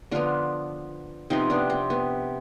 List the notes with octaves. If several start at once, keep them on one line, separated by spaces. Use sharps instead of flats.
D3 F3 B3 D4 F4
C3 F3 B3 C4 D#4
B3 D4
C4
B3